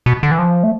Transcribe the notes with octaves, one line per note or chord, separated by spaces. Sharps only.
B2
D3
E3
F3
A3